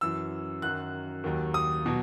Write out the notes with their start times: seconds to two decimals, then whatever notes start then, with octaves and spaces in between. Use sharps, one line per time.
0.01 F#2 E3 E6
0.62 F#2 D#3 F#3 F#6
1.24 D#2 D#3 F#3
1.54 D#6
1.86 B2 F#3